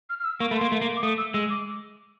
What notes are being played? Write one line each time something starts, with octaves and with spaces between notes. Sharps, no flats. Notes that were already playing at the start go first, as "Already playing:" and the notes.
F6
F6
E6
A#3 C#6
A3 B5
C6
A#3
A3
A#3
D6
A3 D#6
E6
G#3 E6
D6